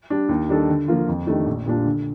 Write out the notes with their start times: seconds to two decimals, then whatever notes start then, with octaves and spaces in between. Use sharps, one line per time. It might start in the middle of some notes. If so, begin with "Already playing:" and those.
0.10 G3 D4
0.29 D#2
0.49 D#3 G3 D4 A4
0.69 D3
0.88 F3 A#3 F4
1.08 F2
1.27 D#3 A3 D4 G4
1.46 A#1
1.66 A#2 G3 D4 F4
1.85 D3